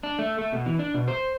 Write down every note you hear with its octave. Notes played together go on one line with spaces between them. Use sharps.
D4
A3
A3
B2
E3
D4
B2
C5